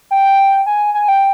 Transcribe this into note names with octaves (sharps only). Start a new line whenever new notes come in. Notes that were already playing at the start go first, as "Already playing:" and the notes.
G5
G#5
G#5
G5